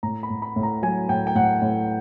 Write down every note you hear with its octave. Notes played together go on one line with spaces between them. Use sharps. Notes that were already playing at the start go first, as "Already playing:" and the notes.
A2 A#5
B5
A2
B5
A2
A#5
F#3 G#5
A2 G5
G5
A2 F#5
A2